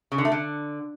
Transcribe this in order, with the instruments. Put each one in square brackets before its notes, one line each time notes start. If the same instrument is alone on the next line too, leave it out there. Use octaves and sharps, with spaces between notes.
[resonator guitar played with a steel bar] C#3
D3
A3
D3